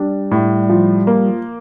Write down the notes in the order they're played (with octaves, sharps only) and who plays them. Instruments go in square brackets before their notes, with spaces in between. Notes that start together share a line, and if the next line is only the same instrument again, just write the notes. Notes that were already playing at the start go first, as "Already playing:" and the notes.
Already playing: [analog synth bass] G3 [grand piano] D4
[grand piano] A2
F3
A#3